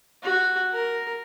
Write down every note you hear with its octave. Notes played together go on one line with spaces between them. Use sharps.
F#4
A#4